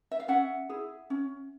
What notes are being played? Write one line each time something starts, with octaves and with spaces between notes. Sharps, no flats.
E5
F5
C#4 E5 F#5
E4 G#4
C#4